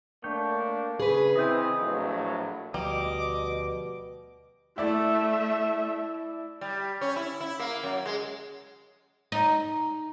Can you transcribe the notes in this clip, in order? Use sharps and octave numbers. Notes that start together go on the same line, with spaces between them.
A3 A#3 D4 C#5 G5
C#3 G#4 B4
E3 C4 E4 D#5 G6
A#1 A2 F#3
D2 B2 F3 G3 D#5 D6
A3 E4 D5 E5
G3
C#4
E4
E4
A#3
F#2
G#3
D#4